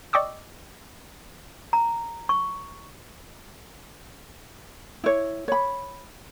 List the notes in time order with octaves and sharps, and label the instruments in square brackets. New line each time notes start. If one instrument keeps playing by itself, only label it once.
[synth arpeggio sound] D5 D#5 G5 C#6 D6 E6
[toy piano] A#5
C#6
[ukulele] E4 C#5
C#5 B5